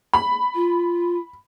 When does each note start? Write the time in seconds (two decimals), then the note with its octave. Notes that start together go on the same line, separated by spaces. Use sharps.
0.13 B5
0.55 F4